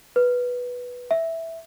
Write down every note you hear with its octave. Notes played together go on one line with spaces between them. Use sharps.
B4
E5